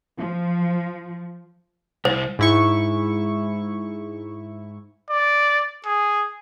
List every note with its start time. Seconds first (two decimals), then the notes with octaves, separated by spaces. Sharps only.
0.18 F3
2.05 C2 C5
2.39 G#2 E4 C#6
5.10 D5
5.86 G#4